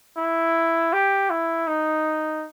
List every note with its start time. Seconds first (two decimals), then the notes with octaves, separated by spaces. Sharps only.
0.17 E4
0.93 G4
1.30 E4
1.67 D#4